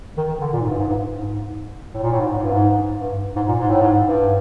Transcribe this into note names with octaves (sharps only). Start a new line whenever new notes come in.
D#3
D#3
D3
A#2
G#2
G2
G#2
G2
G#2
A2
A#2
A2
G#2
A2
G#2
G2
G#2
G2
G#2
A#2
G#2
A2
G#2
G2